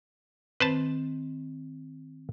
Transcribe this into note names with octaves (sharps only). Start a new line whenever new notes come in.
D#3 C4 B4 C5 A5